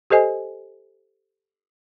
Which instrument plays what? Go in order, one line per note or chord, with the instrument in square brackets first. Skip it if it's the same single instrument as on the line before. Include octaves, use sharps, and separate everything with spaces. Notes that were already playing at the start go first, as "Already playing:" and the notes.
[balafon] G4 A4 C5 D#5 G#5